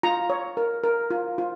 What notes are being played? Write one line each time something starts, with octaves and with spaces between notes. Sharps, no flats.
F4 A#5
C#5
A#4
A#4
F4
F4